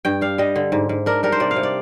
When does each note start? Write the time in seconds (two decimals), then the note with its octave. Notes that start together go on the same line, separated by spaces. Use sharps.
0.05 G2 G5
0.21 D4 F5
0.38 G3 D#5
0.56 D3
0.72 G#2
0.89 G#2
1.06 D4 A#4
1.23 G3 A#4
1.32 C5
1.40 C3 D5
1.51 F5
1.56 C3
1.63 D5